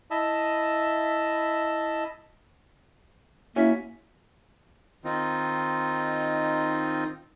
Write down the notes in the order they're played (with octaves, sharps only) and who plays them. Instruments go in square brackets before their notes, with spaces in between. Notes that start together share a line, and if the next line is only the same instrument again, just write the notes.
[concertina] E4 D#5 E5 A5
[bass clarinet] A#3 [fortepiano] C#4 F#4 [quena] E4 [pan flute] E5
[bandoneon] D#3 C4 D#4 F4